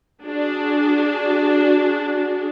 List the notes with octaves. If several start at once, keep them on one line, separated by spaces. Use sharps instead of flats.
D4 F#4 G#4